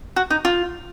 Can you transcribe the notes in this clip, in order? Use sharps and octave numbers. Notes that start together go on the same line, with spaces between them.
F#4
D#4
F4